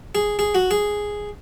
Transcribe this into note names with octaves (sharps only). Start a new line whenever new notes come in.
G#4
G#4
F#4
G#4